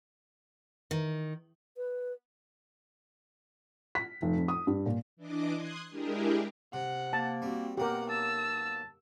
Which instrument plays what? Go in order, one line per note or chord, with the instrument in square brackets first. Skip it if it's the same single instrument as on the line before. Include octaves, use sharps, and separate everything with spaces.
[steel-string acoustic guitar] D#3
[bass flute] B4
[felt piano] B6
F1
F2
D#6
G2
A#2
[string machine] E3 D4 D#5 D6
C6 D#6 F#6 G#6
G#3 D4 E4 G4 G#4 A#4
[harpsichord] C3 [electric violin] F#5
[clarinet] A#3 [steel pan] A5
[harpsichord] G3 [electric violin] C4 F#4
[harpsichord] B1 A#3 [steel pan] G4 A#4 [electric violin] F#5
[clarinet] A5 [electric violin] E6